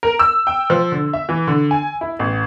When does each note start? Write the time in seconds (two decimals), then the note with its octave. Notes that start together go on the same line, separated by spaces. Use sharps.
0.03 A#4
0.19 E6
0.47 G5
0.70 F3
0.92 D3
1.13 E5
1.29 E3
1.47 D3
1.71 G#5
2.01 E4
2.19 A1